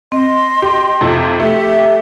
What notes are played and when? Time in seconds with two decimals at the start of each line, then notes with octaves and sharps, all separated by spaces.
0.12 C4 D#5 C6
0.62 G4
1.01 F2 C3 F3
1.40 A3 G4 E5